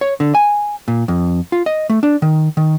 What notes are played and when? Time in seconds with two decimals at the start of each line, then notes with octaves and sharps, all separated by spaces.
0.01 C#5
0.20 D3
0.35 G#5
0.88 A#2
1.08 F2
1.52 F4
1.66 D#5
1.90 A3
2.03 D4
2.22 D#3
2.57 D#3